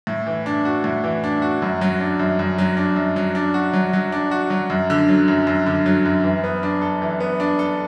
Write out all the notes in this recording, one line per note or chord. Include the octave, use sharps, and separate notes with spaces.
A2
E3
D4
F#4
A2
E3
D4
F#4
F#2
F#3
D4
F#2
F#2
F#3
D4
F#2
F#3
D4
F#4
F#3
F#3
D4
F#4
F#3
F#2
D3
F#3
F#2
F#2
D3
F#3
F#2
E3
B3
D4
A4
E3
B3
D4
A4